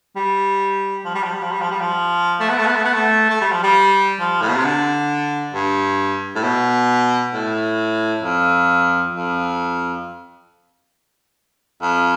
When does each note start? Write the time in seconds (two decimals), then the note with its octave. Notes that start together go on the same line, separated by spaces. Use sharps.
0.16 G3
1.05 F3
1.15 G3
1.24 F3
1.34 G3
1.43 F3
1.52 G3
1.62 F3
1.71 G3
1.81 F3
2.40 A3
2.49 B3
2.58 A3
2.67 B3
2.76 A3
2.85 B3
2.94 A3
3.30 A3
3.41 G3
3.52 F3
3.63 G3
4.20 F3
4.42 A2
4.49 B2
4.56 C3
4.65 D3
5.54 G2
6.35 A2
6.43 B2
7.34 A2
8.23 F2
9.13 F2
11.82 F2